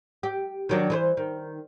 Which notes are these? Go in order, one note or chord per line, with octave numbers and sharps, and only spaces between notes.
G4
D#3 F#3 D4
E3 B4 C5
D#3